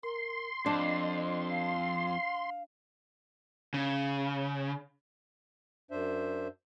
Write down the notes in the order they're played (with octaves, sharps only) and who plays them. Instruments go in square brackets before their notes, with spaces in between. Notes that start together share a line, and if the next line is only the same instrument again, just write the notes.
[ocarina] A#4 [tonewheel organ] C6
[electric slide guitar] F2 [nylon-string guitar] D4 [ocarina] D#5
[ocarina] F5
[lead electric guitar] C#3
[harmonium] F#2 D4 C5 E5